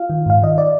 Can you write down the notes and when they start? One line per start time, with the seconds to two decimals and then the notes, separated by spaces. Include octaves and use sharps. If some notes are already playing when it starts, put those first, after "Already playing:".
Already playing: F4 F5
0.10 D#3
0.26 G#2 F5
0.42 D#3 D#5
0.58 D5